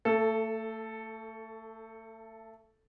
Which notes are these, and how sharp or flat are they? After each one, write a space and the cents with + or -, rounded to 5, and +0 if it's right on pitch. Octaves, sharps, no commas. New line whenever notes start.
A3 +30 A4 +0